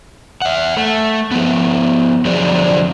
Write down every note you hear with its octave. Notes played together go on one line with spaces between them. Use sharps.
E5 F#5
A3
F3 B3
D3 F3 F#3 C4 G#4 D5